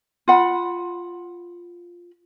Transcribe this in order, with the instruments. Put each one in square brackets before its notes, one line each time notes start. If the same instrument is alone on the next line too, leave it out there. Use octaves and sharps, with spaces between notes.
[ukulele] F4 F#5 B5